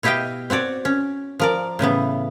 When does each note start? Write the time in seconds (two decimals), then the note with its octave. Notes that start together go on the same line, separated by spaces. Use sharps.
0.03 B2 E4 G4 D#5 F5 G5
0.50 C4 F#4 C#5 D5
0.85 C#4
1.39 F3 A#4 D5
1.79 A2 C#3 E3 B3